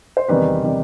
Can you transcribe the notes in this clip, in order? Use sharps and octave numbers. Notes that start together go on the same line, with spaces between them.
C5
E2 C3 D#3 G3 B4
C3 D#3 G3